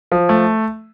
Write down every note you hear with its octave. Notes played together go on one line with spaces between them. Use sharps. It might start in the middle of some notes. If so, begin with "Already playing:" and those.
F3
A3